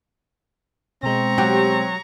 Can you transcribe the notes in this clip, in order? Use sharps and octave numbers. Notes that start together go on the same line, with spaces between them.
B2 G#3 C4 A#5 C#6
F#3 G4